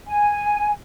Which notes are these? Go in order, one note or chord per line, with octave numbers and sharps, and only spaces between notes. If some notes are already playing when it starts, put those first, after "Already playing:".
G#5